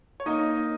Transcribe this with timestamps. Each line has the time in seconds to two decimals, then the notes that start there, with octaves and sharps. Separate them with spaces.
0.20 C#5
0.26 A#3 D#4 D#5